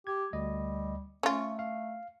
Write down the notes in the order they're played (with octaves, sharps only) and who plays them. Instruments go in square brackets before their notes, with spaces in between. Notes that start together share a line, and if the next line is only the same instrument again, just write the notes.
[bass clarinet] G4 [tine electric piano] G#6
[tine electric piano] D2 D#5 [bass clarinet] G3
[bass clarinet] A3 [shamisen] C#4 F4 [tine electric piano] C#6
[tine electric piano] F5